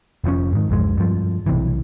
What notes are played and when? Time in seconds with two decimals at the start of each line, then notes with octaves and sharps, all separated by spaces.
0.24 F1 F3 C#4
0.53 G#2 D#3
0.69 B1 F2 G#3
0.97 G2 F3
1.46 B1 C3 E3